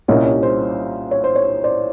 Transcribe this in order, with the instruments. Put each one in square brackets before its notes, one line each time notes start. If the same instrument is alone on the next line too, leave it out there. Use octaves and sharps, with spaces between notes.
[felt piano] C2 A#2 G3 A#3 C#4 C#5 D#5
C#5
C5
C#5
C5
C#5
C5 D5